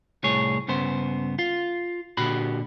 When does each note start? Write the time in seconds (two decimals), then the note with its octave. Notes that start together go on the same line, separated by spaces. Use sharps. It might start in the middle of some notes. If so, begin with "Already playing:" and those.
0.24 C2 A2 G#4 C#5
0.68 G2 C#3 B3 C5
1.39 F4
2.17 A#2 D3 F#4 G4 B5